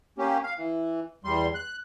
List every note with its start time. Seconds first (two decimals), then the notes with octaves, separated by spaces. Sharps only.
0.18 A#3 C#4 G4
0.44 F5
0.57 E3
1.24 E2 G3 C6
1.55 F#6